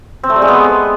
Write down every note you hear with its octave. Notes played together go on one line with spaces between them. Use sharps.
C4
A3
G3
G#3
B3